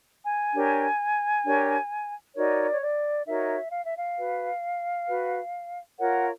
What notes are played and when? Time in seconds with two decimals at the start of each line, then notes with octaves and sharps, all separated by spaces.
0.23 G#5
0.54 D4 G4 A#4 C#5
1.44 D4 G4 A#4 C#5
2.35 D#4 F#4 A#4 C#5 D5
2.72 C#5
2.80 D5
3.26 D#4 F#4 A#4 C#5 E5
3.71 F5
3.84 E5
3.96 F5
4.17 F#4 B4
5.07 F#4 B4
5.98 F4 A#4 C#5 F#5